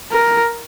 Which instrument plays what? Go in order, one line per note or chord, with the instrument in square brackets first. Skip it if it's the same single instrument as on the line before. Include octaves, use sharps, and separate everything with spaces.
[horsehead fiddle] A#4